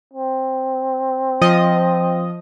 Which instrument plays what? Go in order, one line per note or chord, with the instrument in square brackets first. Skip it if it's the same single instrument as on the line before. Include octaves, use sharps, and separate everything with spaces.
[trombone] C4
[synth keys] F3 D#5